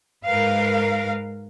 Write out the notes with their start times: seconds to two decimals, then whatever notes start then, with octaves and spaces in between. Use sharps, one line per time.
0.25 G#2 A#4 B4 F5